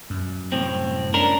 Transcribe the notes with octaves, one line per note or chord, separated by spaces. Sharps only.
F#2
C2 A2 C4
C#4 D4 A#4